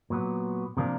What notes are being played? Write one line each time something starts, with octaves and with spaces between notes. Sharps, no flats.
A#2 F#3 B3
C3 F3 A#3 D4